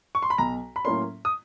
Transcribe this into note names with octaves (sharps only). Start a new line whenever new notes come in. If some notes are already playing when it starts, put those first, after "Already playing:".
C#6
C6
B5
B1 A#5
B5
A2 F#3 A#3 C#4 C6
D#6